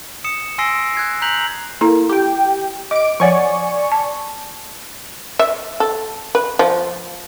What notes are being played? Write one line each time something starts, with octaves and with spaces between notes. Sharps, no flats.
D#6 C#7 E7
G#5 C6 E6 A#6 C7 D7
F#6 G#6 C7
A#5 F#6 G6 B6 F7 F#7
A#3 E4 A4 A#5
G4 G5
D#5 D6 D7
F3 C#5 D5 F#5 G#5 C#6
A5
E5
A4
B4
F3